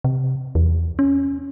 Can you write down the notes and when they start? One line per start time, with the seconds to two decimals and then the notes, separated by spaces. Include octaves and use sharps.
0.04 C3
0.55 E2
0.99 C#4